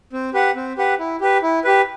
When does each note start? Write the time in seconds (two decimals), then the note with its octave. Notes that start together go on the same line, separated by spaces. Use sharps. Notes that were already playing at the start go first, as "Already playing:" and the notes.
0.13 C4
0.34 G4 B4 F#5
0.56 C4
0.78 G4 B4 F#5
0.99 E4
1.21 G4 B4
1.42 E4
1.64 G4 B4